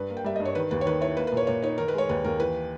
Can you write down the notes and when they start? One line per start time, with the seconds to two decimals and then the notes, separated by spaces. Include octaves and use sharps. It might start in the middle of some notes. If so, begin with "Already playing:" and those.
Already playing: G2 B4
0.10 A#3
0.17 G5
0.24 G3 E5
0.36 G2 D#5
0.45 C#5
0.55 D#3 B4
0.71 D#2 B4
0.81 C#5
0.86 D#3 B4
1.01 E4 C#5
1.17 A#3 B4
1.27 B4
1.32 A#2 C#5
1.47 A#2 C#5
1.62 D#4 C#5
1.78 D#3 A#4
1.88 B4
1.94 G#3 C#5
2.09 D#2 B4
2.24 D#2 A#4
2.39 E3 B4